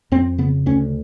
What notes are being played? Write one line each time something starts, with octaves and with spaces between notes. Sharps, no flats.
F2 C4
C#3 B3
D2 C#4